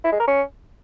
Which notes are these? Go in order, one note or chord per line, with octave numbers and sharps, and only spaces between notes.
E4
G#3
A#4
C#4